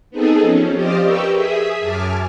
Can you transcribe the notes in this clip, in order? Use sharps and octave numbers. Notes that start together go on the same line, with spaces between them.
B3 C4 D#4 G#4 A4
F3 C#4
G4 C5 D5 D#5 F5
G4 A#4 B4 G5 C#6 E6
G#4 E5 D#6 B6
F#2 G#5 A5 D6 F6